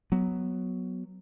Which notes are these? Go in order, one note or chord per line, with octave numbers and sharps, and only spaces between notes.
F#3 B3